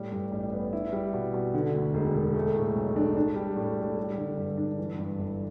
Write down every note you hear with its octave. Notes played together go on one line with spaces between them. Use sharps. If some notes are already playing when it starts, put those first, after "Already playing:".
Already playing: A2 G3
G2
A1
B3
E4
G3
B2
B2
D3
D2
E1
E1
A3
A2
B1
D4
D4
G3
A2
A4
G3
D3
G2
D4
E3
G2
G1